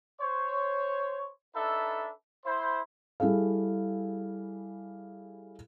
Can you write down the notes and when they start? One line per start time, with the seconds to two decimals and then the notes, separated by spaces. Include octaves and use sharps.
0.21 C5 C#5
1.55 D4 D#4 A4 B4 E5
2.45 E4 C5
3.20 G3 E4 G#4 A4 F5